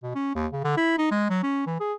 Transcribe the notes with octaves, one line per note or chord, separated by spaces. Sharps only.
B2
C#4
D#2
C#3
D3
E4
D#4
G#3
F#3
C#4
E3
G#4